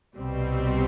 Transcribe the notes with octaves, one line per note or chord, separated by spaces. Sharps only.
C2 B2 G3 C4